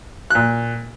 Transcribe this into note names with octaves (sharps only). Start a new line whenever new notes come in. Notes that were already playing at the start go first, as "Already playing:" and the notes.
A#2 F#6